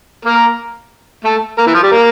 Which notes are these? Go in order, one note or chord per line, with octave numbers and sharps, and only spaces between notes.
A#3 A#4
A3 A4
A#3 A#4
E3 E4
F3 F4
G3 G4
A#3 A#4